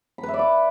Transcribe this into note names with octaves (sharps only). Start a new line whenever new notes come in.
B5
B4
E5
D5
D6